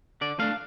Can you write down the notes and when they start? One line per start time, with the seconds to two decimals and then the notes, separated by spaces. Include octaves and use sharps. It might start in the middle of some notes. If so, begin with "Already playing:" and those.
0.21 D3 D5
0.39 A3 D4 F5